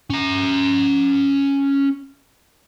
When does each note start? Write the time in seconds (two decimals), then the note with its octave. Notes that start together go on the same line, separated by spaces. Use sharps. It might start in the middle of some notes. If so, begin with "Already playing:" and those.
0.10 C#4 A#5